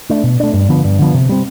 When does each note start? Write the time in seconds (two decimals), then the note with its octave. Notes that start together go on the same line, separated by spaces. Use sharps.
0.10 A3 D4
0.24 B2
0.40 A3 D4
0.54 G2
0.69 D3 F3 B3
0.84 G2
0.99 D3 F3 B3
1.14 C3
1.29 G3 C4